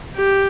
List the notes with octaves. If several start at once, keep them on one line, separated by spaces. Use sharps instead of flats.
G4